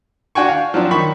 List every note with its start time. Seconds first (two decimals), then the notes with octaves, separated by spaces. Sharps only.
0.35 D4 F#4 G5 G#5 C#6
0.48 F5
0.74 F3 F#3 C4 D4
0.91 D#3 B5 C#6